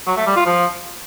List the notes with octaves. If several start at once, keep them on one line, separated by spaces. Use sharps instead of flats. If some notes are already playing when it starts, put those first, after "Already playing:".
F#3
A3
G3
F4
F3